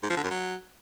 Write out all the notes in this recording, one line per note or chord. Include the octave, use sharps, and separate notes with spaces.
G#2
F3
D3
F#2
F#3